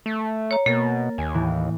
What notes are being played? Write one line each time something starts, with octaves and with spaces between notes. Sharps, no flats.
A3
C#5 A#5
B2 A#3 A#4 A6
D#2 G#5
A2 E3